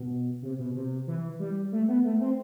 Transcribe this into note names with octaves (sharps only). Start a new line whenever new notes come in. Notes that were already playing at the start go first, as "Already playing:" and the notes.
Already playing: B2
C3
B2
C3
E3
G3
A3
B3
A3
C4